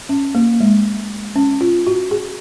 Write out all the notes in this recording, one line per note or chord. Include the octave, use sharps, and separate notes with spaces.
C#4
A#3
G#3
C#4
F4
F#4
G#4